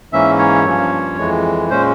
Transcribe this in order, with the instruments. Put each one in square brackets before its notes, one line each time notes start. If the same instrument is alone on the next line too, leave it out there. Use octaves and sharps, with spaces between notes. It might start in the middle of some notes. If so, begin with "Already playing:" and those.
[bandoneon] G#2 E3 A#3 C#4 E5
C#5
G2 F3 A#3 C#4
F2 E3 G#3
A#2 G#3 C#4 C5